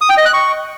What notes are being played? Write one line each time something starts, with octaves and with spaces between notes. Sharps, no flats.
D#6
G5
D#5
F#6
C#6